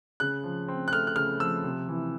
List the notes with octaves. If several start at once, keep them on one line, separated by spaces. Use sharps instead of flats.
C#3 F#6
F3
C4
F#6
A3 F6
F#6
C#3 F6
F3 E6
C3
E3